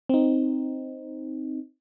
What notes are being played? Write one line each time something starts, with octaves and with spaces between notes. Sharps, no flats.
C4 D#4